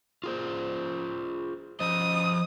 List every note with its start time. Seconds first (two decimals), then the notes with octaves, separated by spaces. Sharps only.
0.24 F4 G#4 C5
1.80 F3 C5 D#5 D#6